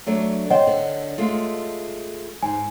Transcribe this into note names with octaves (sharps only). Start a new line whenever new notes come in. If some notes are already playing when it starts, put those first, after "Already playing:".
F#3 A3 D4
C5 C#5 D#5 F#5 G5
D3
G#3 A3 F4
G#2 G#5